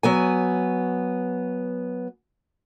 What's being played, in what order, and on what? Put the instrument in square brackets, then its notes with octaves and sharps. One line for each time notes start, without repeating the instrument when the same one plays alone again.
[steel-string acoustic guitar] F#3 B3 G#5